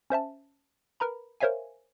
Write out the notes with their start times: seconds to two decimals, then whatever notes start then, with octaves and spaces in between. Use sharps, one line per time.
0.10 C#4 C5 E5 A5
1.00 A#4 B4 A#5 B5
1.40 A#4 C5 C#5 E5 F5 G#5